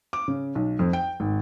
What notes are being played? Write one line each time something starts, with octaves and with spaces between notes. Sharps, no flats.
D6
C#3
B1
F2
G5
G#1